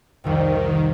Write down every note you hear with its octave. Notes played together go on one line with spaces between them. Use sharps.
C2 F2 C3 D#3